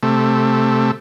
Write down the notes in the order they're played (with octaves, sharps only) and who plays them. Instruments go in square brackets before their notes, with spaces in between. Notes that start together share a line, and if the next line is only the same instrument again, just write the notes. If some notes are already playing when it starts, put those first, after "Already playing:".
[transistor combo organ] C3 A3